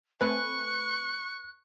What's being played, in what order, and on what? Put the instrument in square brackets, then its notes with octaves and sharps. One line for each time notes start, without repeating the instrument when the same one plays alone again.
[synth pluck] A3 C4 G#5 [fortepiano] B4 [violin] C#6 [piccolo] F#6